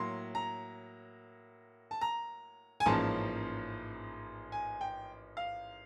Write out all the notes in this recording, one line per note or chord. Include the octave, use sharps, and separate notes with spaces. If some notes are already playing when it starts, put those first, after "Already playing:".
Already playing: A2 F#3 A#3 C6
A#5
A5
A#5
G#5
A1 G#2 F3 A#3 C#4 A5
G#5
G5
F5